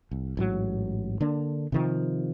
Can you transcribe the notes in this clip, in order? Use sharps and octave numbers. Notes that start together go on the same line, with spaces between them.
C2
A1 G#2 F#3
D3 A#3 D4
C3 D#3 F3